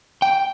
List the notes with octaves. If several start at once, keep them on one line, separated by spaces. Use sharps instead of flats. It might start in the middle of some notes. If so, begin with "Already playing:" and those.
G5